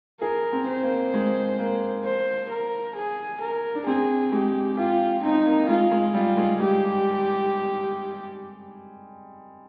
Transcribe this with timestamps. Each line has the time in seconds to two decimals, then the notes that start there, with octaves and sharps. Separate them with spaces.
0.21 G#4 A#4
0.53 C4
0.67 C5
0.83 A#3
1.14 G#3
1.59 A#3
2.04 C5
2.50 A#4
2.95 G#4
3.40 A#4
3.75 D4
3.86 C4 G#4
4.32 G#3 G4
4.77 F4 G4
5.23 C4 D#4
5.46 A#3
5.69 G#3 F4
5.91 G#3
6.14 G3 F4
6.37 G#3
6.60 G#3 G4